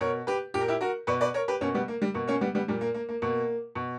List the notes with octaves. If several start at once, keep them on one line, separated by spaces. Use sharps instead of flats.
B2 A#4 C#5
G4 B4
A#2 G4
A#4
E4 G4
F#4 A#4
B2 B4 D5
B4 D5
A#4 C#5
G4 B4
B2 A#3 C#4
G3 B3
A#3
G3
B2 A#3
A#3 C#4
G3 B3
G3 B3
A#2 G3
A#3
A#3
A#3
B2 A#3
B2